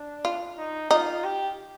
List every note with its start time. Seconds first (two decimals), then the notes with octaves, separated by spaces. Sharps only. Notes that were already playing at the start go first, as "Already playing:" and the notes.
Already playing: D4
0.25 F4
0.57 D#4
0.91 D#4 F4
1.24 G4